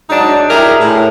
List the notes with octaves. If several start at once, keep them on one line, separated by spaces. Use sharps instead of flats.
G#2 F#3 D4 D#4
E4 G4 G#4 A#4
A2